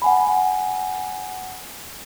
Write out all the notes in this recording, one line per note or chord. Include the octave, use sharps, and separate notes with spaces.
F#5 G#5 B5